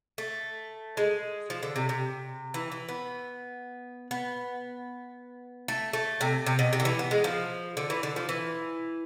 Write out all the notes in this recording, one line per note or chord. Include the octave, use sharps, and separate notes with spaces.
A3
G#3
F3
D3
C3
C3
E3
E3
B3
B3
A3
A3
C3
C3
B2
C3
D3
E3
B3
G#3
F3
D3
E3
D3
F3
E3